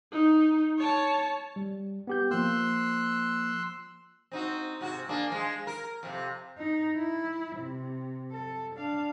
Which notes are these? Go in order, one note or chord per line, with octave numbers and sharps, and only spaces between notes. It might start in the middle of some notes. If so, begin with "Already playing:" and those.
D#4
C#5 A5
G3
B3 G4 G6
F3 A#3 C6 E6 F#6
C4 D#4 F#4
G#2 C3 F#4
A#3 D4 G#4
F3 G#3
A#4
F2 C3
D#4
E4
C3
A4
D4 F5